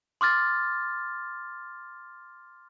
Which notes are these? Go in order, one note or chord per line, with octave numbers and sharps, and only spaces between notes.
C6 D6 F6 A6